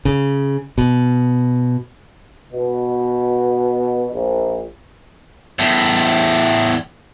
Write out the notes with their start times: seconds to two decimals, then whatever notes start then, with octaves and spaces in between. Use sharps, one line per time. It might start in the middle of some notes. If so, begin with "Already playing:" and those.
0.05 C#3
0.78 B2
2.53 B2
4.13 A#1
5.59 E2 A2